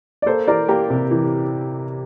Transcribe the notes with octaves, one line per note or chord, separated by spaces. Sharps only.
D5
A#3 A4 C5
E3 A#4 D5
A#3 G4 A#4
C3
E3